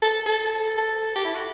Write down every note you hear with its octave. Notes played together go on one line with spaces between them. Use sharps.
A4
A4
A4
G4
E4
F#4